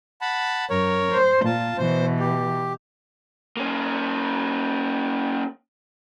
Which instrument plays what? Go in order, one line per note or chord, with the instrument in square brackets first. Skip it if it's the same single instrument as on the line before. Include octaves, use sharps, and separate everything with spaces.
[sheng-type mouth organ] F#5 A5 B5
[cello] F#2 [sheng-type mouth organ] A#4 C#5
[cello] C5
[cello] A#2 [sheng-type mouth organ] F4 A5
[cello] B2 E3 [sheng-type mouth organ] C5
[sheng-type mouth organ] G4
[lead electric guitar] A#3 C#4